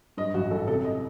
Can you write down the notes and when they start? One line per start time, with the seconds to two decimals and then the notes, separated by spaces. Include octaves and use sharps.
0.17 G2 D#5
0.34 A1 F#4
0.51 A1 A4
0.68 C3 A4
0.84 D#5